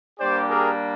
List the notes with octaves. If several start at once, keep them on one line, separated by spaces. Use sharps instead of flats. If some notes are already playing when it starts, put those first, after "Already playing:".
G3 A#3 D4 G4 C5 D5
G#4 A#4